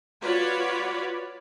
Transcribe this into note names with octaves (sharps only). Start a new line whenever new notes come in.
F4 F#4 B4 C#5 D5 B5